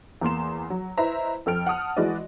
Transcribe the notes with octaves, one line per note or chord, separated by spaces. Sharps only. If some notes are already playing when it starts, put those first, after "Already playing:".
E2 A#3 C6 E7
F#3
E4 B4 C5 D#5 E5 A#5
F2 A4 G5 F6 D7
F#5 A5 D#6 F6
E3 G#3 E4 F#4 D5 D#5